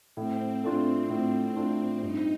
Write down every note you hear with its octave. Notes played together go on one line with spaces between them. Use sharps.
A2 C4
A3 D4 F4
A2
A3 D4 F4
G2 D#4